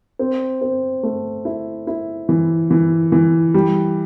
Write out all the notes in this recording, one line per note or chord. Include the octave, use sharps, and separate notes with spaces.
C4
C4
A3
E4
E4
E3
E3
E3
G3